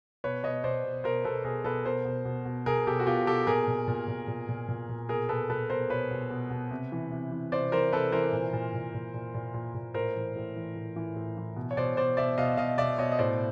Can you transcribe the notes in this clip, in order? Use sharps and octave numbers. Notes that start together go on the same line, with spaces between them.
B2 B4 C#5
B2 C#5 D#5
B2 C5 D5
B2
B2 A#4 C5
B2 A4 B4
B2 G#4 A#4
B2 A4 B4
B2 A#4 C5
B2
B2
B2
B2 G#4 A#4
B2 G4 A4
F#4
B2 F4 G4
B2 G4 A4
A#2 G#4 A#4
A#2
A#2
A#2
A#2
A#2
A#2
A#2
B2 G#4 A#4
B2 A4 B4
B2 A4 B4
B2 A#4 C5
B2 B4 C#5
B2
B2
B2
C3
E3
C3
E3
C3 C5 D5
E3 A#4 C5
C3 A4 B4
E3 A#4 C5
A#2
A#2
A#2
A#2
A#2
A#2
A#2
A#2
A2 A#4 C5
E3
A2
E3
A2
E3
A2
E3
B2
C#5
B2 C5 D5
B2 C5 D5
B2 D5 E5
B2 D#5 F5
B2 D#5 F5
B2 D5 E5
B2 C#5 D#5
D#5
A2 C5 D5